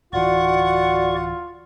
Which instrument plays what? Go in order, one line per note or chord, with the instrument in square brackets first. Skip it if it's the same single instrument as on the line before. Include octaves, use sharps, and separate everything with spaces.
[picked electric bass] D1 E3 [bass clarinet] F4 [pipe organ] F#4 D5 C#6 [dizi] F#5